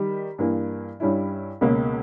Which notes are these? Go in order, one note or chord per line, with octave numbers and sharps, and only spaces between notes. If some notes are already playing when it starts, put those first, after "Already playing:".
Already playing: D#3 G3 G4
G2 E3 A#3
G2 G3 C#4 E4
C#2 B2 A#3 C#4